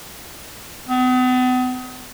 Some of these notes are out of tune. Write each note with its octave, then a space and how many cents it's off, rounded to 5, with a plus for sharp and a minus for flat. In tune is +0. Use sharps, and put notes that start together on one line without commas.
B3 +40